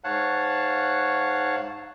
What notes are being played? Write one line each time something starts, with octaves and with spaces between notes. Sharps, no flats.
G#2 C#5 F5 F#5 A5 F#6